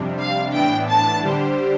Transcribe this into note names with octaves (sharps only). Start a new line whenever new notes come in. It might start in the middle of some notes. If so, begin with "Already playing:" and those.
Already playing: F2 C3 G3 D4
F5
A2 E3 B3 D4 G5
A5
D3 G3 D4 G4 C5